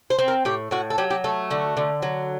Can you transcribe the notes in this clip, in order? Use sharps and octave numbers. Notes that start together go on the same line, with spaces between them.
C5
C4
A#4
A2 G4
A2 F#4
A4
F#3 G4
G4
A3 A4
D3 F#4
D3
F#3